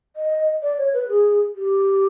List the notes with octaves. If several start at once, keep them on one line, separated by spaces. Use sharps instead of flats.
D#5
D5
C#5
B4
G#4
G4